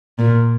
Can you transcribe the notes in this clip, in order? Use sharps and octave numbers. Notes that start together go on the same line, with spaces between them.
A#2